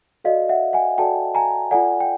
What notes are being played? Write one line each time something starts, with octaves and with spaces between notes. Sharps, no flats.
F#4 A4 D5 D#5 F5
E5 F#5
F#5 G#5
F#4 A4 D5 G5 A5
G#5 A#5
F4 A4 D5 F#5 G#5
G5